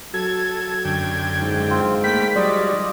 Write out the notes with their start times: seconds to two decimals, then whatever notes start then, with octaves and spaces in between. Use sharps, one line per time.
0.14 F#3 A4 G#6
0.85 F#2 D3 G5
1.42 G#2
1.70 C4 F4
2.04 A3 A#3 G5 B5 B6
2.36 F#3 G3 F4 D5 D#5